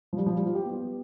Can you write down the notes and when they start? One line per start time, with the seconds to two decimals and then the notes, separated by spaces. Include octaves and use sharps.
0.13 F3
0.17 G3
0.26 F3
0.36 G3
0.45 F4
0.55 G4
0.65 B3